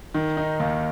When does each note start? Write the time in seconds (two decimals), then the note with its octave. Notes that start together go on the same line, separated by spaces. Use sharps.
0.14 D#3
0.37 D#4
0.60 D#2